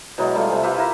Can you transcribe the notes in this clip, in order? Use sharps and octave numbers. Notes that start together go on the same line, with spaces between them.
B2 E3 F#3 G#3
G3 A3 F4
C3 A4 G#5
F4 G4 B4 E5
E4 A#4